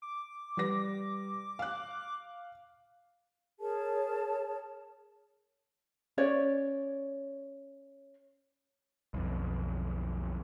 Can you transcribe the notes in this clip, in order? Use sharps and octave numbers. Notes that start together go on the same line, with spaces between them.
D6
G3 B4 A#6
F5 F#6
G#4 A#4 C#5 A5
C#4 C#5 D5
B1 F2